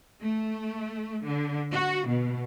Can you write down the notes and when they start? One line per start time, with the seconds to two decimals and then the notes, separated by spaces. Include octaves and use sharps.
0.22 A3
1.24 D3
1.73 F#4
2.08 B2